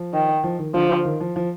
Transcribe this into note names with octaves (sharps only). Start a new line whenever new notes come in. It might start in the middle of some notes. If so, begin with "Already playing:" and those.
Already playing: F3
D#3
F3
D#3
D3 F3
D3
D#3
F3
F3